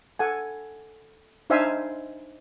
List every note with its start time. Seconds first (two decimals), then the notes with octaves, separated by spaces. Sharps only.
0.19 A4 F#5 G#5
1.50 D4 D#4 C5 E5 F5 G#5